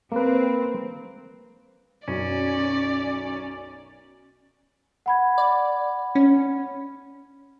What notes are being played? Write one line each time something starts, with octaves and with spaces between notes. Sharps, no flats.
A#3 C4 B4
B1 F#2 C#4 D5
F#5 B5 G#6
D5
C#4